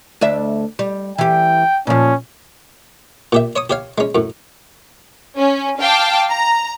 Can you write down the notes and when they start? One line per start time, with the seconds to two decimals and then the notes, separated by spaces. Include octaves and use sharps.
0.21 D2 D4 E5
0.79 G3
1.18 E3 G4 G5
1.87 A#2 F3 C#4
3.32 A#2 G4 E5
3.56 C#5 C#6 D#6
3.70 G4 C#5 F5
3.98 G#3 C#4
4.15 F#2 A2
5.37 C#4
5.80 F5 G5 A5 D6
6.31 A#5